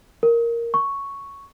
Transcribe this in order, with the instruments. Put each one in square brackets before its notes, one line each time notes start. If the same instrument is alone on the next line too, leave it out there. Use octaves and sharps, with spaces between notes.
[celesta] A#4
C#6